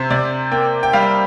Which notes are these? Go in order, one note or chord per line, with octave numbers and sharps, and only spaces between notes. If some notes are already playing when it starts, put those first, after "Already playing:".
Already playing: C3 C5
C3 D5
A#3 G5
G5
G3 F5